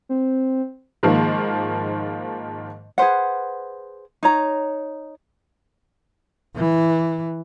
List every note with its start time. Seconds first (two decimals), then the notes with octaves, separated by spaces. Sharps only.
0.09 C4
1.03 G#2 D#3 F3 A#3
2.98 G#4 B4 C5 F#5
4.23 D#4 C#5 A#5
6.56 E3